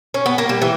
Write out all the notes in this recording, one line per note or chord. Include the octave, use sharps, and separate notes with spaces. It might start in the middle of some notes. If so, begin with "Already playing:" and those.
C#4
B3
A#3
G3
E3